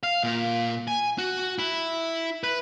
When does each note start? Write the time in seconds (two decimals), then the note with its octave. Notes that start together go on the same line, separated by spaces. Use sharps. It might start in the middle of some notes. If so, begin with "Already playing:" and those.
0.03 F5
0.23 A#2
0.88 G#5
1.18 F#4
1.59 E4
2.44 B4